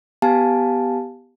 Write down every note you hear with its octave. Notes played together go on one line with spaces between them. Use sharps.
B3 G4 F5 G#5 A5